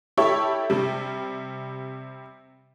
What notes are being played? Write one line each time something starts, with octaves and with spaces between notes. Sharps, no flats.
E4 G4 A4 C#5 E5 C#6
C3 G3